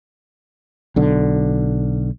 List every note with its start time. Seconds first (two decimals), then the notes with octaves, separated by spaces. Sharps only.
0.96 B1 D3